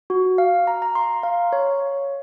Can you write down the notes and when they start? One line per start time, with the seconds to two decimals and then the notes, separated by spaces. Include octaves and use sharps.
0.10 F#4
0.38 F5
0.67 A#5
0.82 A#5
0.95 C6
1.23 F5
1.53 C#5